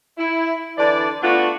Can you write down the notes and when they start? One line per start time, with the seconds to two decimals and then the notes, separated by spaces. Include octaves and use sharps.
0.18 E4
0.78 D3 E3 D5
1.22 A3 B3 D4 F4 F#4